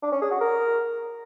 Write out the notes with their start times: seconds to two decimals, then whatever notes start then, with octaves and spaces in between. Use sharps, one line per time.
0.03 D4
0.12 C#4
0.22 G#4
0.31 F#4
0.41 A#4